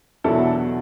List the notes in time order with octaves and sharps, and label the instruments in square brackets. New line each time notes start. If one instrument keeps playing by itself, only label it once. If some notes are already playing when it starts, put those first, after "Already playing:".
[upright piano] E2 B2 F#3 D4 E4 A4